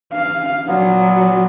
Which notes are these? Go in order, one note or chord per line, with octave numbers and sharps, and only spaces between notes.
F5
A#2 F#3 B3